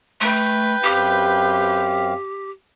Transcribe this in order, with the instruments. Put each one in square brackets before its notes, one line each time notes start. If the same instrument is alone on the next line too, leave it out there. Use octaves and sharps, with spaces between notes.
[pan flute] A3 [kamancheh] B4 G5
[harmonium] F#2 C4 F5 [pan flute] G4